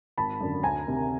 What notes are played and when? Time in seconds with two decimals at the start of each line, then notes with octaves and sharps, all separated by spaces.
0.17 G#1 A5 B5
0.40 F#2 D3
0.63 D2 G#5 A#5
0.87 C3 D#3